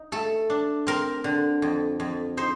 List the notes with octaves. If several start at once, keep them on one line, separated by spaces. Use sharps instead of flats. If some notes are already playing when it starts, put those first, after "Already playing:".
Already playing: D#4
A3 A4
D4
C4 A#4
D3
F2
F2
D#4 C5